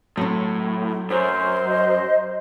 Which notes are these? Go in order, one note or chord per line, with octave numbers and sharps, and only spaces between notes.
A2 F#3 C4
F#2 C5
D#5